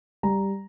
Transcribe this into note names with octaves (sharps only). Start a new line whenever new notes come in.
G3 A#5